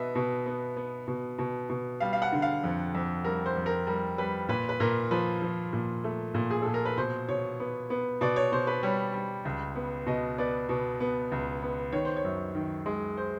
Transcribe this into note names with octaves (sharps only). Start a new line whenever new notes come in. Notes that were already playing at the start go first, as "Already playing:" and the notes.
Already playing: B2 B3 D#5 E5
B2
B3
B3
B2
B2
B2
G3 F5
F5
F#5
D3
F5
F2
F2
G3 A#4
C5
F2
A#4
G3 A#4
G3 B4
A#2 B4
B4
A#2 A#4
F3 B4
F3
A#2
A3
A#2
G#4
A#2 A4
A#4
B4
B2 C5
B2 C#5
B3
B3
B2 D5
C#5
B2 C5
B4
G3 C#5
G3
C#2
B3
B2 D#5
B3 D5
B2
B3
C#2
B3
D#3 C#5
C5
C#5
F#2
D#3
G#3
C5